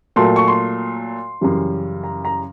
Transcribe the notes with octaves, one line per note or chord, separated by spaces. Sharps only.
A#2 F#3 A3 C6
C#6
C6
F#2 C#3 E3 G3
A#5
A#5